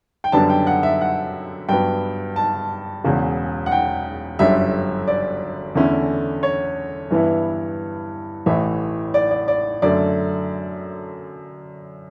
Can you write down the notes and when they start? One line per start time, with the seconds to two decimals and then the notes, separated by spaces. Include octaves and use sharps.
0.24 G5
0.32 F#2 D3 G3 B3 D4 A5
0.50 G5
0.67 F#5
0.83 E5
1.01 F#5
1.69 G2 F#3 B3 G5
2.36 A5
3.04 E1 E2 C#3
3.66 F#5
3.72 G5
4.39 G1 F#2 D3 G3 E5
5.08 D5
5.75 E2 D3 A3 C#4 E4
6.43 C#5
7.11 G2 E3 B3 E4
8.46 A1 A2 E3 E5
9.14 D5
9.31 D5
9.48 D5
9.82 F#2 D3 A3 D5